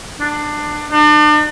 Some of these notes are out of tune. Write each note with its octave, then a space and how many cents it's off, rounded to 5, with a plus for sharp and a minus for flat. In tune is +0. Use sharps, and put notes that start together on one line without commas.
D4 +20
D4 +40